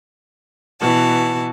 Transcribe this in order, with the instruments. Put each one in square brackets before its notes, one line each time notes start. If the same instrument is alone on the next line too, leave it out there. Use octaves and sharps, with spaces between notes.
[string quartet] B2 E3 F#4 A5